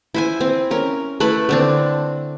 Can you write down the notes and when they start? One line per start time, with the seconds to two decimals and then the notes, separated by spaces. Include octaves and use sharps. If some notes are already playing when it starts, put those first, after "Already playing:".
0.14 E4 C5 G#5
0.41 C4
0.71 C#4 A#4
1.20 A3 E4 B4 B5
1.49 D3 C4 D4